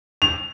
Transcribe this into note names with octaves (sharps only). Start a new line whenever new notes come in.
F7